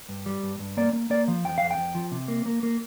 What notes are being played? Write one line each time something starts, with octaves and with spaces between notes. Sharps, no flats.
G2
G3
G2
G2
A#3 D5
A#3
A#3 D5
F3
F2 G5
F2 F5
G5
F2
F3
C3
A#3
A#3
A#3